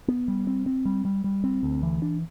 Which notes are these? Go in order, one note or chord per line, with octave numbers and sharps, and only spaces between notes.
B3
G3
C4
C4
G3
G3
G3
C4
D2
E3
D4